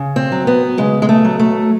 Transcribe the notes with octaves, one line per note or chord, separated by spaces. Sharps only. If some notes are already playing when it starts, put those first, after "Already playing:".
Already playing: C#3
C4
F#3
B3
C#3 G#3
G#3
A3
F#3
A3